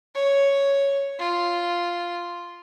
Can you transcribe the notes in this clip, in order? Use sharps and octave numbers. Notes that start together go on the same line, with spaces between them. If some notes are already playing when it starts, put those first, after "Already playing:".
C#5
F4